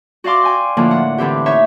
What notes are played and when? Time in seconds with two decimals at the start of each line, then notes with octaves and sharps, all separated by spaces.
0.24 F#4 D5 F5 C6 D6
0.43 G5 G#5
0.77 A2 D3 F3 A#3 D4
0.91 F#5
1.18 D3 E3 C4 G4
1.46 D#4 C#5 E5 C#6